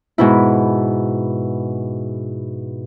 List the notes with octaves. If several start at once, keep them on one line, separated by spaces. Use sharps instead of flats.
G#2 B2 E4